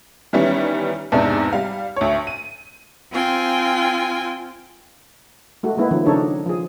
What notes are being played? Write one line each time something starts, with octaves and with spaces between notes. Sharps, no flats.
D#3 E3 G3 B3 C#4
E2 G#2 C3 D4 D#4
G3 F5
D2 C#5
D#7
C4 F4 G5 G#5
G#3 A3 F#4
G#3 A#3 B3 E4
D#3 F3 C#4
C#3 D4 D#4 G#4 A4 C#5
F3 G#4